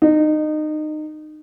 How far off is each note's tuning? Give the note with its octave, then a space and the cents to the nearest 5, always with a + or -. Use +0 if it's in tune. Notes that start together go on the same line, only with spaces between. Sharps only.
D#4 -25